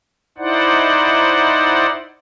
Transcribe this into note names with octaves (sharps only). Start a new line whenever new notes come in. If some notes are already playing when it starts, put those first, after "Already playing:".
D#4 E4 C5 D5 F#5